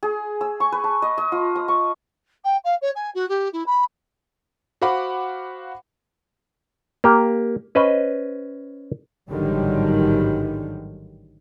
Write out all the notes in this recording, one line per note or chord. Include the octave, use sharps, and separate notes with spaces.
G#4
E6
C#6
B4
A5
D#5
D#5
F4
D#6
C#6
G5
F5
C#5
G#5
F#4
G4
E4
B5
F#4 C5 F5 F#5 B5 D6
A#3 G4
C#4 B4 C5 D#5
A1 G#2 D3 D#3 F#3 G3